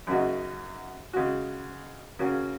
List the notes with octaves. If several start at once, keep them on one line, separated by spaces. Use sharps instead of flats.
F#2 C#3 A#3 D#4 F#4
C#3 G#3 F#4
C#3 A#3 C#4 F#4